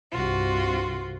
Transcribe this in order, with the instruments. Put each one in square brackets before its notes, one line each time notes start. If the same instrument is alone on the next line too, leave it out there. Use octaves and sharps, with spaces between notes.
[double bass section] C2 G2 C3 [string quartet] F4 F#4